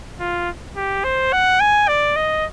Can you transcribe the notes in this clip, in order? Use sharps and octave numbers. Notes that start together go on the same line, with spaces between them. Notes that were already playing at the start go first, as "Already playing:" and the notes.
F4
G4
C5
F#5
G#5
D5
D#5